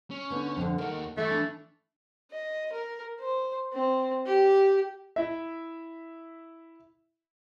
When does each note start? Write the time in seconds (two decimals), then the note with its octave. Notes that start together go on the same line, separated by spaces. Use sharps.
0.11 C#4
0.30 D3 B3 D#4
0.57 F2 D3
0.78 D#2 D#3 A#4 F#5
1.17 E3 A3 E5
1.31 D4
2.31 D#5
2.72 A#4
3.20 C5
3.73 C4
4.26 G4
5.16 E4 E5